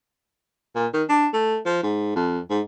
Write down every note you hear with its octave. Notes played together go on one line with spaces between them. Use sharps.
A#2
D#3
D4
A3
F3
G#2
F2
G#2